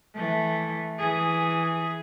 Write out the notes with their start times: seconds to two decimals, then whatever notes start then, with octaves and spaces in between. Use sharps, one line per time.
0.16 E3 A3
1.00 E3 G#4